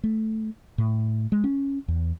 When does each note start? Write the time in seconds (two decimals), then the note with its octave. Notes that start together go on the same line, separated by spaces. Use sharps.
0.04 A3
0.78 A2
1.32 G#3
1.44 C#4
1.88 E2